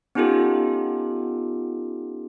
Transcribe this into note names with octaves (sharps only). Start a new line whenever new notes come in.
B3 C#4 D#4 F4 G4 A4